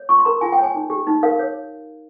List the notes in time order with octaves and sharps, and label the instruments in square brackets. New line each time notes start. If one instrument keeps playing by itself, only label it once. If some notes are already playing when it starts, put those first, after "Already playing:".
Already playing: [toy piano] C#5
F4 C#6
C6
A#4 A#5
F4 G#5
G5
C#5 G#5
D#4
G4
D#4
A#4 F5
C#5